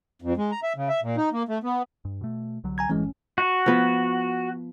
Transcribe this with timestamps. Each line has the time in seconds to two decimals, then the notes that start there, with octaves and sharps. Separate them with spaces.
0.22 F2
0.37 G#3
0.52 A#5
0.63 E5
0.76 C#3
0.89 E5
1.02 A#2
1.17 D#4
1.33 A#3
1.48 A3
1.63 B3
2.05 G2
2.21 B2 A3
2.64 C2 D3 F#3
2.78 G#5 A#5 G#6
2.89 F#1 A2 E3 G#3 C#4
3.38 F#4
3.66 F3 B3